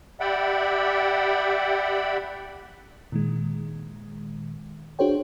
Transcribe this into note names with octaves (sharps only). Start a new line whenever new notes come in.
G4 D5 E5 F#5 G5 B5
A#2 D#3 G#3
D4 F#4 G#4 C5 C#5 G5